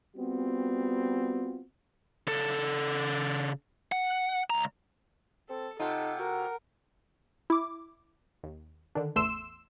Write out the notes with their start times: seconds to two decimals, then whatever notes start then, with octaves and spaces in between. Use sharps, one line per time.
0.16 G3 B3 C4 F4 F#4
2.27 C#3 A4
3.92 F#5
4.50 C#2 A#5
5.50 C4 A4
5.80 C3 D#4 F4 A4 F#5
6.19 F#4 A#4
7.50 E4 D6
8.44 D#2
8.95 D3 D#3 D4
9.15 A1 E2 A3 C6 E6 E7